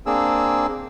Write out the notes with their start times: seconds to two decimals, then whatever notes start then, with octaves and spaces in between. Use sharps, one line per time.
0.06 A#3 C4 D4 G#4 E6